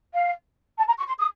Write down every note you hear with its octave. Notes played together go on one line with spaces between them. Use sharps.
F5
A5
A#5
C#6
C6
D#6